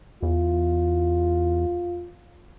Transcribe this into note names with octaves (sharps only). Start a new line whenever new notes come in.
E2 F4